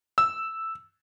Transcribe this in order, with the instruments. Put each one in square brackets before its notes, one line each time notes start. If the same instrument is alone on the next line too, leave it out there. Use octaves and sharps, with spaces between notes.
[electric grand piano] E6